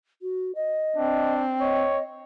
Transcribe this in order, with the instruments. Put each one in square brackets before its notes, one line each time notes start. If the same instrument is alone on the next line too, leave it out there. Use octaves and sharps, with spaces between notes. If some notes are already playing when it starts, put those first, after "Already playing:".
[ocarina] F#4
D#5
[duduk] C4 [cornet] D4
[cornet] C#5 [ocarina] D#5